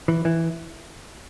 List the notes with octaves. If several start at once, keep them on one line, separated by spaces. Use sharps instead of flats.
E3
E3